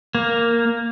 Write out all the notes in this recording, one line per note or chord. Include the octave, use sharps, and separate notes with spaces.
A#3